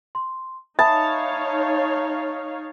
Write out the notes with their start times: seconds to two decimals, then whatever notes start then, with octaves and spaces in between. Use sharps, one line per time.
0.15 C6
0.79 D#4 C#5 E5 F5 A5 B5 D#6